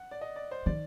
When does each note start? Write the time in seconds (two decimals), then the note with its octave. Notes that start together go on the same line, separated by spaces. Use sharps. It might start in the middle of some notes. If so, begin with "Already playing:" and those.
Already playing: F#5
0.11 D5
0.21 D#5
0.36 D5
0.51 C5
0.66 D#3 D5